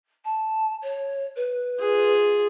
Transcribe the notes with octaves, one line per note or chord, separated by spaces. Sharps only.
A5
C#5
B4
F4 G#4